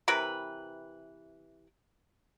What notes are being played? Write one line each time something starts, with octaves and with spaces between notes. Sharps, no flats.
C3 E3 A#4 B4